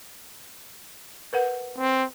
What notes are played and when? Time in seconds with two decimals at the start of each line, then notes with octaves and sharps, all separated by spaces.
1.33 A#4 B4 F#5
1.78 C4